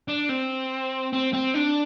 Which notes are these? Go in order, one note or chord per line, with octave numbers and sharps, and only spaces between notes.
D4
C4
C4
C4
D4